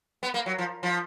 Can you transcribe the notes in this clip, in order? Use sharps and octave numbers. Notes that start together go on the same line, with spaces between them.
B3
A#3
F#3
F3
F3